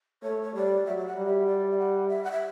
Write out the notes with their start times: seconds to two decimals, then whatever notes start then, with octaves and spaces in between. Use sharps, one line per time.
0.23 A3 C#5
0.43 C#5
0.54 G3 D5
0.85 F#3 E5
0.98 E5
1.06 F#5
1.17 G3
1.26 E5
1.46 D5
1.71 E5
1.78 F#5
2.08 E5
2.24 F#5
2.31 E5